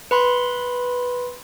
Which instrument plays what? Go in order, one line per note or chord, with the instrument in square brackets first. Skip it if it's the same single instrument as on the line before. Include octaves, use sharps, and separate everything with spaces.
[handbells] B4 B5 C6